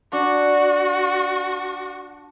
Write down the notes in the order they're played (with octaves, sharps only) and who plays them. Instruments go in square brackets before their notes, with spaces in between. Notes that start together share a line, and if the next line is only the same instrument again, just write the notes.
[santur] D4 [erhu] F#4